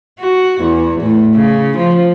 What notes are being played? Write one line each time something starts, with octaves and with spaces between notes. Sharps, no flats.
F#4
E2
A2
C#3
F3